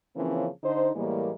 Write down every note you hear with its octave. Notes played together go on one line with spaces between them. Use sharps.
C#3 E3 F3 A#3 C4 C#4
D3 D#4 C5
A2 E3 G3 G#3 A#3